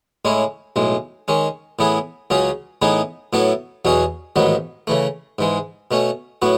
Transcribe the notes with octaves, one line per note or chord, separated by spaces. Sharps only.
A2 G#3 C#4 E4
B1 A2 G#3
D#3 G#3 C#4
A2 E3 B3 E4 G#4
C#2 C#3 F#3 C#4 G#4
A2 E3 B3 D#4 G#4
A2 F#3 B3 E4 A4
E2 B2 F#3 C#4 G#4
A1 G#2 D#3 F#3 B3
C#3 E3 A3
G#2 E3 G#3
B2 A3 C#4
A2 F#3 B3 F#4